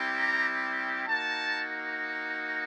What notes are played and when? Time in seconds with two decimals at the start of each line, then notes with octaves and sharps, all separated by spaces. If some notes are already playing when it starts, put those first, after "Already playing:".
Already playing: G3 C4 E4 G4
0.19 A#5
1.08 A#3 D#4 F#4 A5